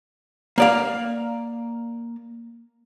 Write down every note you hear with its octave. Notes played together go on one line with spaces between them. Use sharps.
A#3 D5 F5